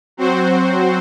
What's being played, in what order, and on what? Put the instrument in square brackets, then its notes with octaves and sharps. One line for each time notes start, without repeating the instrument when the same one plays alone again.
[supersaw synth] F#3 C4 F#4 C5